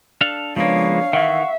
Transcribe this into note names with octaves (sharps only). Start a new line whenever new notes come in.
D4 A4 F5
C#3 F3 G#3 A#3 B3 D4 C#5 F5
D#3 E3 E5 F#5 C#6 E6